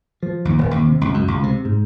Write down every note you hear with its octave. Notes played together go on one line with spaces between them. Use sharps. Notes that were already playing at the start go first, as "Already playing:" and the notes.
F3
D#2
D#1
D#2
C3
C#2
F#2
C#2
C3
G#2